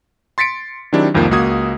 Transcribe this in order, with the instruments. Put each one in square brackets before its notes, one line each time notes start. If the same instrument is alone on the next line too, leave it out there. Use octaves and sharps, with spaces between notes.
[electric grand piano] C6 A6 B6 C#7 D7
D#3 F#3 C4 D4 E4 G4
C2 F2 D#3 F3 A#3
C#2 A#3 F#4 D#6 G#6